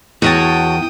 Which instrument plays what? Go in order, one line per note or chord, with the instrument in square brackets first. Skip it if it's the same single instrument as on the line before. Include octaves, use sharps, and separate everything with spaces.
[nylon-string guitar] E2 [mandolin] F#4 C#5 A5 [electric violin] G5 D#6